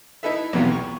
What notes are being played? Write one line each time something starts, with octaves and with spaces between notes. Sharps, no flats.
D#4 E4 A4 B4 E5
B1 E2 C3 B3 F4
C#6